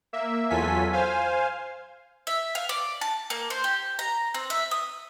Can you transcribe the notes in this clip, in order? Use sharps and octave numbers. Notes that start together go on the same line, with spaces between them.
A#3 E5
E2 F#3 F4 A4 G#5 B6
C5 F5 G#5
E5
F5
D5
A5
A#3
C5
G4
A#5
C4
E5
D#6